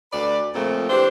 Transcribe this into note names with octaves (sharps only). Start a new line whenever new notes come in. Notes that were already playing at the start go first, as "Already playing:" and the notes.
D2 B4 D5
A#2 C#3 F3 A3 C4
E3 C4 D4 G4 C5